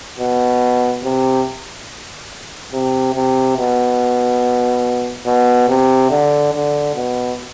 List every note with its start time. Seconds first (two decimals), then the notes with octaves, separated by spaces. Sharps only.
0.20 B2
1.04 C3
2.73 C3
3.15 C3
3.58 B2
5.27 B2
5.69 C3
6.10 D3
6.53 D3
6.96 B2